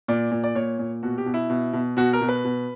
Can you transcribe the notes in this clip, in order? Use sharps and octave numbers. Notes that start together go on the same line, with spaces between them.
A#2 D5
A#2
D5
A#2 C#5
A#2
B2 F#4
G4
B2
E4
B2
B2
B2 F#4
A#4
B2
B4
B2